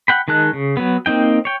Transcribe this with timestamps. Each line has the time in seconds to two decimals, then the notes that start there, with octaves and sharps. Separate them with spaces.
0.08 F#5 G5 B5
0.28 D#3 G#3 A5 F#6
0.53 C#3
0.77 F#3 B3
1.06 A#3 C4 D#4 G5
1.45 C#5 G5